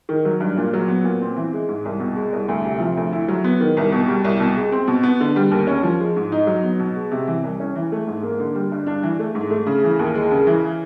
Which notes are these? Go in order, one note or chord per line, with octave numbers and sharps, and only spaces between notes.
D#3
F#3
G2
A#2
F#3
B3
A#2
C4
E3
G#3
G#2
C2
B2
G#3
C2
D2
C3
F3
D2
E4
F#3
B3
D#3
C2
B2
G3
C2
B2
G#3
C4
B2
B3
D3
G3
D#2
C#4
F3
G#3
G#2
D#4
F#3
B3
B2
G#3
C3
E3
C2
C#4
E3
A3
G#2
A#3
D3
G3
G2
D4
E3
A3
G#2
A3
C#3
E3
D#2
G#3
C#3
E3